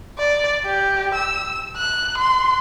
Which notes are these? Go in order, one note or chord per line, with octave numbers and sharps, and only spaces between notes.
D5
G4
E6
F#6
C6